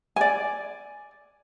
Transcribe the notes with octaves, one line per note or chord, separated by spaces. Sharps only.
D5 G#5